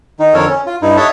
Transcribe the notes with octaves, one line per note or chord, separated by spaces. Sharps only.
D#3 D#4
F2 D3 A4 A#4 C#5
C#4
F4
G2 D#4 E4
A4 C#5 D#5 E5 F#5 A5